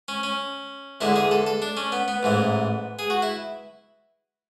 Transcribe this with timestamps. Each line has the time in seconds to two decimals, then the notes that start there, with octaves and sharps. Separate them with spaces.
0.08 C#4
0.23 C#4
1.01 E2 D3 G#3 E4
1.16 G#4
1.31 A4
1.47 A4
1.62 D4
1.77 C#4
1.92 B3
2.08 B3
2.23 A1 G#2 E3
2.99 G#4
3.10 F#4
3.22 E4